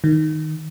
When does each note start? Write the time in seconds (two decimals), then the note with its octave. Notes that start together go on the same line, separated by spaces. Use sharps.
0.04 D#3